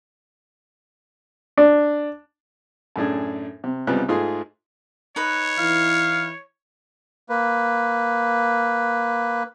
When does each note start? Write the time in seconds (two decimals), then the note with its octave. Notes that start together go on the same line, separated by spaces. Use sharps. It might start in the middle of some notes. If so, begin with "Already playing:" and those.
1.57 D4
2.96 F#2 A2 D4 G#4
3.64 C3
3.87 C#2 C3 G3 B3 F4 F#6
4.09 G#2 A3 F4 G#4 C6
5.16 D#4 B4 C#5
5.59 E3 E4 F5
7.29 A#3 B4